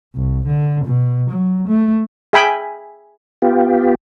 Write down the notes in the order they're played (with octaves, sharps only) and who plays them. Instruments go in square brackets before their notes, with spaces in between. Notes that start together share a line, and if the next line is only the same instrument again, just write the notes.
[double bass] C2
D3
B2
F#3
A3
[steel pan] G#4 E5 G5 G#5 B5
[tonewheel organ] B3 F4 G4